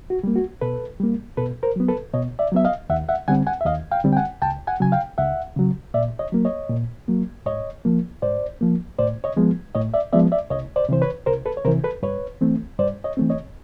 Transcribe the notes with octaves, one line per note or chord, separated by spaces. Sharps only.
F#4
G3 A#3
F#4
B2 A4 B4
G3 A#3
B2 A4 B4
A#4 C5
F#3 B3
A4 B4
B2 C#5 D#5
D5 E5
F#3 B3 E5
D#5 F5
D#2 E5 F#5
E5 F#5
D3 G3 C4 F#5 G#5
F#5 G#5
E5
D#2 D#5 F5
F5 G5
D3 G3 C4
G5
F#5 G#5
C#2 G5 A5
F#5 G#5
C#3 F#3 G#5
F5 G5
C#2 E5 F#5
C#3 F#3
A#2 D5 E5
C#5 D#5
F#3 A#3
C#5 D#5
A#2
F#3 A#3
G#2 C#5 D#5
F3 A#3
G#2 C5 D5
F3 A#3
A2 C5 D5
C#5 D#5
F3 G#3 B3
A2 C#5 D#5
D5 E5
F3 G#3 B3 D5 E5
D5 E5
C2 C#5 D#5
C5 D5
C3 E3 C5
B4 C#5
C2 A#4 C5
A4 B4
C#5
C3 E3 A#4 C5
A4 B4
G2 B4 C#5
E3 A3 C4
G2 C5 D5
C#5 D#5
E3 A3 C4
C#5 D#5